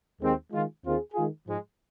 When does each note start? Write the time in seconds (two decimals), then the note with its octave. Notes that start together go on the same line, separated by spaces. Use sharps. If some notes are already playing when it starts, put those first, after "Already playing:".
0.21 D#2 D#3 G#3 C4
0.52 D#3 G#3 F4
0.83 D#2 D#3 C4 F4 G#4
1.14 D#3 G#3 F4 G#4
1.45 G#2 F3 G#3